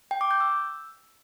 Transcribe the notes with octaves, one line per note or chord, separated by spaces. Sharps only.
G5
D6
G6
E6